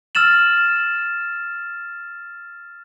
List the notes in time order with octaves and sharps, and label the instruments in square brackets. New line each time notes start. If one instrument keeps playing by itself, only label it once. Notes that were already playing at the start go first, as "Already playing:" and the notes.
[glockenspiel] E6 F6 A6 E7 F#7